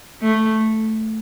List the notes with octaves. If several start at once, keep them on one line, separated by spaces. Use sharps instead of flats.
A3